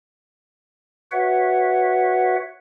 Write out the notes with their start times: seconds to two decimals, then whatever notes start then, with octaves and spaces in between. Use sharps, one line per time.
1.11 F#4 B4 C#5 E5 F#5